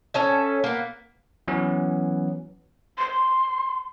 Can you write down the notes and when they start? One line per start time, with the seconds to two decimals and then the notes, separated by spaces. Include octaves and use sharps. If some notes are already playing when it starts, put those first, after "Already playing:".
0.14 C#4 A4 E5
0.64 A#3 B3
1.48 E3 F#3 B3 C#4
2.98 C6